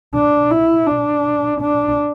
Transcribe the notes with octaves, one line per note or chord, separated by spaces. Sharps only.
D4
E4
D4
D4